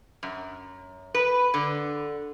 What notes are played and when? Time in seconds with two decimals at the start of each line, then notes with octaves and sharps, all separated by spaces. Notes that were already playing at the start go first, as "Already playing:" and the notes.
0.23 F#2
1.14 B4
1.54 D3